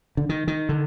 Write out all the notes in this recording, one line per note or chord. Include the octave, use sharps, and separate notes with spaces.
D3
D#3
D#3
D3